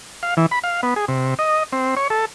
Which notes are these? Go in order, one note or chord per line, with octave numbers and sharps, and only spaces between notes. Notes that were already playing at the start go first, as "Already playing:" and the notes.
F5
E3
B5
F5
B3
G#4
C3
D#5
C4
C#5
A4